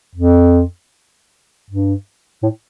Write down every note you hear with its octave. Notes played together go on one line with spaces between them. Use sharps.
F2
G2
A2